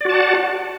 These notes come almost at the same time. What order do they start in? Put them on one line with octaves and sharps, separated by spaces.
D5 F#4 A5 F#5